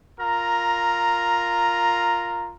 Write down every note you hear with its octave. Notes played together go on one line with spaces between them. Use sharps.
F4 A#4 A#5